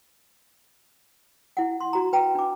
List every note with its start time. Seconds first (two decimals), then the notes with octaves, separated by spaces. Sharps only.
1.57 E4 F#5
1.81 C6
1.93 F#4 A#5
2.13 B4 G5 A#5
2.35 D4 D6